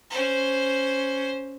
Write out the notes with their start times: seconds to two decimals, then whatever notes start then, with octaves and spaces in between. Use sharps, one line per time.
0.10 C#4 C5